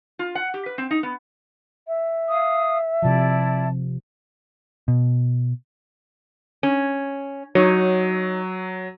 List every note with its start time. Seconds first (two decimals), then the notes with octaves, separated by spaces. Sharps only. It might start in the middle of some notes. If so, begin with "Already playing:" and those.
0.19 F4
0.35 F#5
0.54 G4
0.66 B4
0.78 C4
0.91 D#4
1.03 B3
1.88 E5
2.29 F5 D#6
3.02 C3 F3 E4 D5 A5
4.88 B2
6.63 C#4
7.55 F#3 D#4 C#5